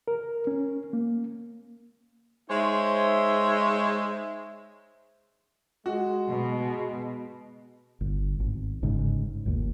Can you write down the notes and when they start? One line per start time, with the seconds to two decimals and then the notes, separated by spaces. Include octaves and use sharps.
0.08 A#4
0.47 C#4
0.93 A#3
2.50 G#3 D#4 C5 C#5 E5
5.86 G#3 F#4
6.30 B2
8.01 G1
8.40 G#1
8.82 G1 G#2 C#3
9.46 G1 D#2